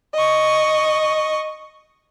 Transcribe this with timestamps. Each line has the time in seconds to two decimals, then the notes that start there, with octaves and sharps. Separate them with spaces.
0.15 D#5 C#6